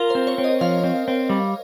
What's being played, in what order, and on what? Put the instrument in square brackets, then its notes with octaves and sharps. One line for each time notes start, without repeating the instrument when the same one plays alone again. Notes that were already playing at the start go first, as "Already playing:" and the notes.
Already playing: [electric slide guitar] F4 [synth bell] A#4
[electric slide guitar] C4 [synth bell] C5
[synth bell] C#5
[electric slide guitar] C4
[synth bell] D#5
[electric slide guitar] F3 [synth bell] F5
[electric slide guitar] C4
C4
G3